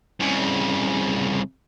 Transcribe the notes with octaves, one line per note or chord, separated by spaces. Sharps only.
C2 C#3